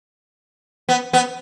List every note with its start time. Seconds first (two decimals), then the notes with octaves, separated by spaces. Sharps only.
0.89 B3
1.13 B3